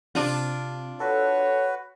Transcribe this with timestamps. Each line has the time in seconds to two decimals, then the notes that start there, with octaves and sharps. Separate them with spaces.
0.15 C3 D4 F4
1.00 F#4 A4 B4 C#5